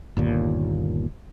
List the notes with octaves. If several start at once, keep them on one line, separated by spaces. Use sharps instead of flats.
G1 D#2 A#2